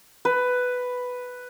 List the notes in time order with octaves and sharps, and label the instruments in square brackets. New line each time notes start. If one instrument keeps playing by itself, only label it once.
[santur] B4